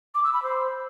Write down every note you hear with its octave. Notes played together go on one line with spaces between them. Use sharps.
D6
E6
B5
C5